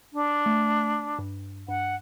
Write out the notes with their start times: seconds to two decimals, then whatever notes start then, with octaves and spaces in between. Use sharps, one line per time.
0.13 D4
0.46 A3
1.19 G2
1.68 G2 F#5